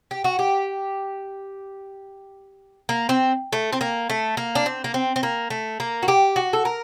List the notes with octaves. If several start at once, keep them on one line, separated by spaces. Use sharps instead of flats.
G4
F#4
G4
A#3
C4
A3
C4
A#3
A3
A#3
D4
C4
A#3
C4
C4
A#3
A3
A#3
F#4
G4
F#4
A4
A#4